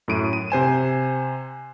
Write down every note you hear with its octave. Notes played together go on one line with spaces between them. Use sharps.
F#2 A2 D7 D#7
D#7
C3 C5 G#5 E7